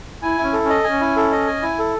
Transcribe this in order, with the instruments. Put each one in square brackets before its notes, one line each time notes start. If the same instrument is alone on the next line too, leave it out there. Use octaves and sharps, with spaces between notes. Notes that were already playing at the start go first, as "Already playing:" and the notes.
[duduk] E4 [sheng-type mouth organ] G#5
[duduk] C#4 [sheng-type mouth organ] E4
[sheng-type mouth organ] A4
[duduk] C#4
[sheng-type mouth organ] D#5
[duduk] C#4 [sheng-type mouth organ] G#5
[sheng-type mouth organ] E4
A4
D#5
G#5
E4
A4